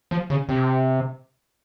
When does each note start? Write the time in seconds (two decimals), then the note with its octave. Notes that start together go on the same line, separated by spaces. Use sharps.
0.11 F3
0.30 C#3
0.49 C3